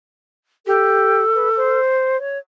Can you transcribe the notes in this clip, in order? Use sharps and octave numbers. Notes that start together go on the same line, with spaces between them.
G4 A4
B4
C5
C#5